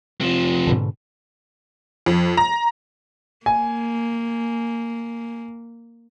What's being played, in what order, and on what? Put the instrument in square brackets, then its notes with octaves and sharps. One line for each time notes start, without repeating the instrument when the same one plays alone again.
[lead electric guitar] C3 F3
[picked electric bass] G#2 B2 D3
[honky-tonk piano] F2
A#5
[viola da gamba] A#3 [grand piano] G#5